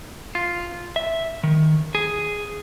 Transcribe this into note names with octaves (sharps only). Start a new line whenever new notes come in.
F4
E5
D#3
G#4